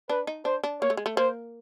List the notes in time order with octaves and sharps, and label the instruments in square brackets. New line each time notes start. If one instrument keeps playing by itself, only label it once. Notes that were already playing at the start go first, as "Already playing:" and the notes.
[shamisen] D4 [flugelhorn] B4
[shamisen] D#4
[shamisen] D4 [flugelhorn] C5
[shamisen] D4
[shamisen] A#3 [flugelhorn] C#5
[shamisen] A3
G#3
A3
[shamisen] A#3 [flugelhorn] C5